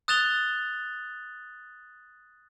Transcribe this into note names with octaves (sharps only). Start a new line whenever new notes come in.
D#6 F#6 A6 E7 F7 G7